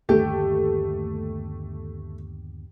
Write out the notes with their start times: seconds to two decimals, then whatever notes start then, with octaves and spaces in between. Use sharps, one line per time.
0.09 G1 D#2 A3 G4